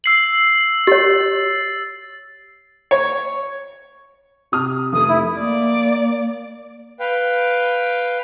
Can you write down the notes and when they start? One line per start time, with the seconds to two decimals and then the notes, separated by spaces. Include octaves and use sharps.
0.04 E6 C7 F#7
0.87 G4 C#5 A6
2.91 C#5
4.52 C3 D#6 F6
4.93 F1 A3 D#6
5.08 E4
5.39 A#3 D5
7.00 B4 F5 G5